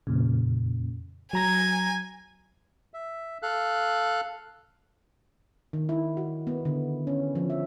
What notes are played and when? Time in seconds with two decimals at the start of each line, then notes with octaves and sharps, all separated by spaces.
0.07 F2 A#2 C#3
1.33 F#3 G#5 A#5 A#6
2.94 E5
3.43 A4 F5 F#6
5.73 D#3
5.89 E4
6.17 F#4
6.47 B3
6.65 D3
7.07 C#4
7.35 F3
7.50 E5